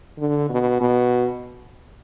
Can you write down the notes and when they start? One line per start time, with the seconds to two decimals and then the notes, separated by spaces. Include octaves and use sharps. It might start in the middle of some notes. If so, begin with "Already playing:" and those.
0.19 D3
0.50 B2
0.81 B2